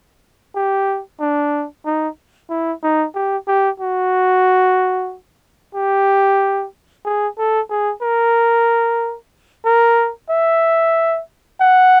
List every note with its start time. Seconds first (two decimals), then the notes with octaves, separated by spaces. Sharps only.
0.55 G4
1.20 D4
1.85 D#4
2.50 E4
2.83 D#4
3.15 G4
3.47 G4
3.80 F#4
5.75 G4
7.05 G#4
7.38 A4
7.70 G#4
8.02 A#4
9.65 A#4
10.30 E5
11.60 F#5